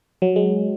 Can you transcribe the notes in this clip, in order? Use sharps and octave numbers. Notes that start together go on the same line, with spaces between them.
F#3
G#3